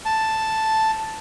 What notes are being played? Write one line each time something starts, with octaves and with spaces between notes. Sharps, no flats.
A5